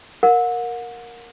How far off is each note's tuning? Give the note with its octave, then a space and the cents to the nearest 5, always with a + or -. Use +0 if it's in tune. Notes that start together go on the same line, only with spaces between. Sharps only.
A#4 +0 F#5 -35